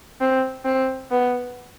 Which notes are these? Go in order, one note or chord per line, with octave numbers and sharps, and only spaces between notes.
C4
C4
B3